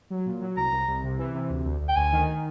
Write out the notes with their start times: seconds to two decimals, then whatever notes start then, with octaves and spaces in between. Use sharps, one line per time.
0.10 F#3
0.26 A#2
0.41 F#3
0.57 C2 A#5
0.72 C2
0.88 C2
1.03 C3
1.18 E3
1.34 C3
1.50 D2
1.65 D2
1.80 D2
1.89 G5
1.96 D2 G#5
2.12 D#3